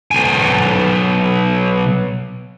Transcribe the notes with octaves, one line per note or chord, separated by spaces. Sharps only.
B1 G#5